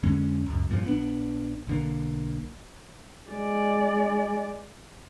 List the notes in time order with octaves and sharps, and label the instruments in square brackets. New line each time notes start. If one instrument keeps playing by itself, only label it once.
[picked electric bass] F2 D3 G#3 C#4
C#2 F#2
G2 A#2 D3 F3
A#1 B3 D4
B1 D3 A#3
[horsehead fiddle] G#3 D5